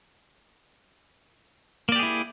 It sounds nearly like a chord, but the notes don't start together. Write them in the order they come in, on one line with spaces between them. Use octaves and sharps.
A#3 D5 G4 G#4 E4